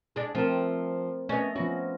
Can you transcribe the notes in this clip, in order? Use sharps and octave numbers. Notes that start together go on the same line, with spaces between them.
G#3 D4
F3 A3 C4 A#4
A3 B3 C#4 D#5
F3 B3 C#4 F#4